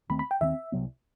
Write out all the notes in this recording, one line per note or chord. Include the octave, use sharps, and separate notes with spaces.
D#2 D#3 A3 C4 B5
B5
G5
D#2 D#3 A3 C4 E5
C2 C3 F#3 B3